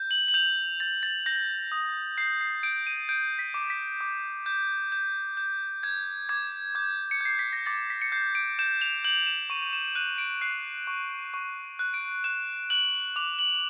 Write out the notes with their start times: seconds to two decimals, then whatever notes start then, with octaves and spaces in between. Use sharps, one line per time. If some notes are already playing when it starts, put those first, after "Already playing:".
Already playing: G6
0.11 F#7
0.28 F#7
0.34 G6 F7
0.80 G6 A6
1.03 A6
1.26 G6 A#6
1.72 D#6
2.18 G6 C7
2.41 C7
2.63 G6 D7
2.87 D#7
3.09 G6 D7
3.39 B6
3.54 D6
3.70 B6
4.01 D6
4.46 G6
4.92 G6
5.37 G6
5.83 G6 G#6
6.29 D6 G#6
6.75 D6 G6
7.11 C#7
7.21 G6 C7
7.39 B6
7.53 A#6
7.66 D6 A6
7.90 B6
8.01 C#7
8.12 G6 C7
8.35 D7
8.59 G6 E7
8.81 F7
9.04 G6 F#7
9.27 E7
9.50 C#6 D#7
9.73 E7
9.95 F#6 D#7
10.18 D7
10.41 F#6 C7
10.87 C#6
11.34 C#6
11.79 F#6
11.94 D7
12.24 F#6 E7
12.70 F#6 F#7
13.16 D6 F7
13.39 F#7